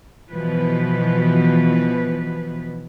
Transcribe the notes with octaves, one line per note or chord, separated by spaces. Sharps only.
B2 E3 F3 B4